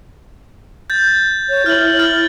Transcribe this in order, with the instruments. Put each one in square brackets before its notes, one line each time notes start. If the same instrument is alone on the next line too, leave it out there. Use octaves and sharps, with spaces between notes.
[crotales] G6 A6
[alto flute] C#5
[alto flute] E4 [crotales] F6 F#7
[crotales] F6 A6